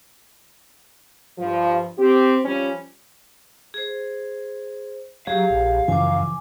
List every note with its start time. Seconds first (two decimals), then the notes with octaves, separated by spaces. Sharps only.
1.39 G2 F3
1.98 C4 G4
2.45 F3 G3 C#4
3.74 G#4 C5
5.27 F#3 G4 G#4 F5
5.51 A#1
5.88 F#2 C#3 E3 F3 G#5 D6